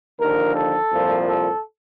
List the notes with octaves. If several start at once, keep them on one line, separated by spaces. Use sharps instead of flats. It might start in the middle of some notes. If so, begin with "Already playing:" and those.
D#2 D3 F3 A#4
A4
C2 A#2 F3
A4